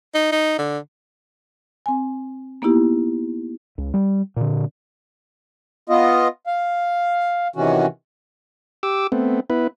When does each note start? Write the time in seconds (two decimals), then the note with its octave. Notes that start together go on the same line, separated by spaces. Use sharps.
0.14 D#4
0.32 D#4
0.59 D3
1.86 C4 G#5
2.62 A#3 B3 D#4 E4 G4
3.78 C#2
3.94 G3
4.36 A#2 D3
5.89 B3 F4 D#5
6.47 F5
7.56 C3 D#3 E3 C#4 F#4
8.83 G4 D6 E6
9.12 A3 B3 C4
9.50 B3 E4 B4